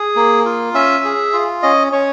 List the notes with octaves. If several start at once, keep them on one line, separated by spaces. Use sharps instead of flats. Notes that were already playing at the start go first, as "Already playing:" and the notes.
Already playing: G#4
A#3
F4
C#4 E5
G#4
F4
C#4 D#5
C#4 C#5